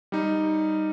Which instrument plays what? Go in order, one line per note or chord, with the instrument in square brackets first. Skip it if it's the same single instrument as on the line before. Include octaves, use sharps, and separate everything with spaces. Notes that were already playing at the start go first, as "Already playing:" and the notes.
[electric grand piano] G3 D#4